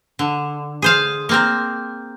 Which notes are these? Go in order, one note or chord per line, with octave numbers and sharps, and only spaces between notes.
D3
G#4 C5 F5
A#3 C4 A#4